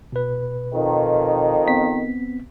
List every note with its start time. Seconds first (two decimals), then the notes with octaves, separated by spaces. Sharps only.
0.12 B2 B4
0.72 F2 D#3
1.67 B3 C4 B6